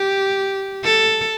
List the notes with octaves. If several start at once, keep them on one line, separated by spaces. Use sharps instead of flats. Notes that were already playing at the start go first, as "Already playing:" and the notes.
Already playing: G4
A4